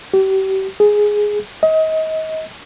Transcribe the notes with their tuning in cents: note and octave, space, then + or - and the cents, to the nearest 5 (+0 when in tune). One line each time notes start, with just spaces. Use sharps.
G4 -35
G#4 +5
D#5 +30